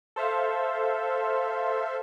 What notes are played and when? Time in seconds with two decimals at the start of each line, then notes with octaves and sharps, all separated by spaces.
0.16 A4 C5 E5 F5